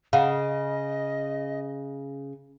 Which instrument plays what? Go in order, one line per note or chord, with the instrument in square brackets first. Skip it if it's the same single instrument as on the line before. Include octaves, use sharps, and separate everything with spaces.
[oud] C#3 [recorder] D#5 [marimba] F5 F#5